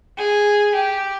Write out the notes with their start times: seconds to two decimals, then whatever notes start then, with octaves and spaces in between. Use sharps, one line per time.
0.18 G#4
0.74 G4